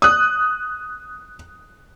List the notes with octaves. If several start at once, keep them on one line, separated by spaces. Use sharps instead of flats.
D#6 F#6